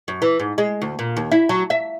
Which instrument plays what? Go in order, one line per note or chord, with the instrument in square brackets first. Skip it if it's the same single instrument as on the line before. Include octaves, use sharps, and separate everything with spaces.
[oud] F#2
E3
G#2
G#3
D2
A#2
D#2
E4
F#3
E5